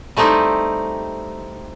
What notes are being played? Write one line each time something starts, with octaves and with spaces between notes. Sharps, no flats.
G3 A3 C4 D#4 E4